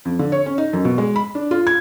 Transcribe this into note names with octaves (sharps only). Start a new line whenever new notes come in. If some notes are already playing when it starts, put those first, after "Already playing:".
F2
D3
C#5
C#4
D#4
F#2
B2
G#3
B5
D4
F4
G#6